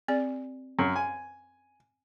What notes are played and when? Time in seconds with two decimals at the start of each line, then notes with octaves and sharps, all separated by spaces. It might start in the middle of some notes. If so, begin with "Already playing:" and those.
0.08 C4 G#4 D5
0.79 F#2
0.96 G#5